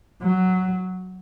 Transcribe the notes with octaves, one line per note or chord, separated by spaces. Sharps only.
F#3